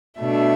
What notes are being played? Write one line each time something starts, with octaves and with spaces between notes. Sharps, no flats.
B2 A3 D4 E5